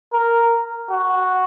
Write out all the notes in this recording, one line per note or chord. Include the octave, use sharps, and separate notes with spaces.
A#4
F#4